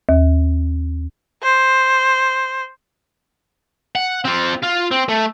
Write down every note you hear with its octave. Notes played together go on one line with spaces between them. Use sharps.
D#2
C5
F#5
C4 F4
F4
C4
A3